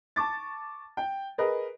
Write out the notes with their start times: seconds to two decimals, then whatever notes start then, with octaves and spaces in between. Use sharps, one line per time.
0.16 A5 C#6 D6 A6
0.97 G5
1.38 G#4 A#4 B4 D#5